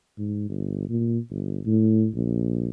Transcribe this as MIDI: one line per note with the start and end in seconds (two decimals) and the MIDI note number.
0.18 0.46 44
0.49 0.86 31
0.89 1.18 46
1.30 1.60 31
1.66 2.07 45
2.15 2.70 34